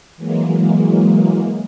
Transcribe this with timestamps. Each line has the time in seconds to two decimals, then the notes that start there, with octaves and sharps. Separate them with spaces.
0.16 E3 F#3 G#3 A#3